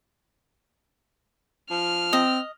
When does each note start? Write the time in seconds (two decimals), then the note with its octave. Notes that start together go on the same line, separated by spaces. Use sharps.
1.70 F3 F6
2.13 C4 D#5